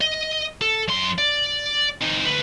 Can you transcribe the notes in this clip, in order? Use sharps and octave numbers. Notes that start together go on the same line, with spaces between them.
D#5
A4
F#2 C6
D5
C4 D#4
D2 B4